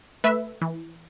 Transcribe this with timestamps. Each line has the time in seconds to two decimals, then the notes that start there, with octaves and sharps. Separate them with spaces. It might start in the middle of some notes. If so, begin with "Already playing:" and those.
0.24 A3 B4 E5
0.61 E3